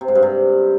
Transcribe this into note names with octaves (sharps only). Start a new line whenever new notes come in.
C3
G#2
G2
C3